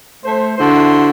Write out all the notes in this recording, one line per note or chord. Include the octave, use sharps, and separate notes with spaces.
A3 C5
D3 E4 F#4 C5 C6